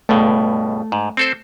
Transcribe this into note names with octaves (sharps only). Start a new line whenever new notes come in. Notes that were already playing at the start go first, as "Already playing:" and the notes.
C#2 G2 B2 A3
G#2
C4 A4 C5